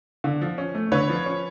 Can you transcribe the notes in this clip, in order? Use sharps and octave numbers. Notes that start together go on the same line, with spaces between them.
D3
F3
C#4
A3
D3 B4 C#5
F3
C#4